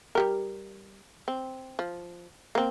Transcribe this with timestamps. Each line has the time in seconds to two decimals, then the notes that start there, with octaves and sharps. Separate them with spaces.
0.15 G3 G4 A#4
1.28 C4
1.79 F3
2.55 A#3 C4